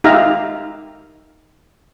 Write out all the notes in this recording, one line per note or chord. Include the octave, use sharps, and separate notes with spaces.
D#4 G4 E5 F5 A#5